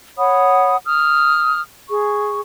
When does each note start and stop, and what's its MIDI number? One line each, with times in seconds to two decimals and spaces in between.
0.17 0.75 73
0.17 0.75 78
0.17 0.75 83
0.17 0.75 87
0.85 1.60 87
0.85 1.60 89
1.89 2.40 68
1.89 2.40 85